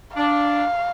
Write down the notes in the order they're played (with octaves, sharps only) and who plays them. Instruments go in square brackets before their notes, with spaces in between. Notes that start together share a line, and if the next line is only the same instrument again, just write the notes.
[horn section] D4 [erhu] F5